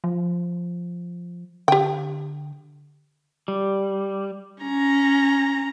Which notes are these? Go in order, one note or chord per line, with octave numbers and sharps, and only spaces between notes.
F3
D3 G4 G5
G3
C#4 A#5